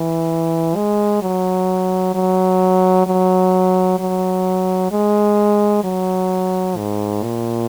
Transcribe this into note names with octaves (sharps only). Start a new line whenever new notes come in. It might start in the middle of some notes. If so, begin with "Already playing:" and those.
Already playing: E3
G#3
F#3
F#3
F#3
F#3
G#3
F#3
G#2
A#2